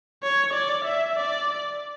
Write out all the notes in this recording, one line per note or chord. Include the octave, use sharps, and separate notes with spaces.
C#5
D5
E5
D5